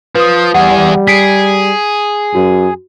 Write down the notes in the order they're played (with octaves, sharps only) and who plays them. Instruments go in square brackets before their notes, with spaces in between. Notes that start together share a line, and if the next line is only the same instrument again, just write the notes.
[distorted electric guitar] F3 [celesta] B4 D#6
[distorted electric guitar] E2 G#4 [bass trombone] G3 [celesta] F#5
[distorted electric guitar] G#4 [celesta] B6 C7 D7
[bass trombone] F#2 [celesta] F#4